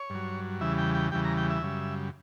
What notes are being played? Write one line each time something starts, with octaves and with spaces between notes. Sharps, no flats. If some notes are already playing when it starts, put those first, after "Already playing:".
Already playing: C#5
G2 F#3
E2 C#3 E3 G3 E5
G5
G5
E2 C#3 E3 G3 G5
A#5
G5
E5
F#2 C#3 G3